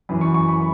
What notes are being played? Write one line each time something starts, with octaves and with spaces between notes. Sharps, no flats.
F#2 E3 B5
C#6
C#6
B5